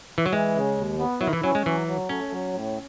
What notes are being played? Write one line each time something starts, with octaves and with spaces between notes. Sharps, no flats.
E3
F#3
E3 G#3
C#3
D#2
B3
F#3 E4
D#3
E3
F#3 C#4
G#3
E3 F#3
F#3
A3 C#4
F#3
A2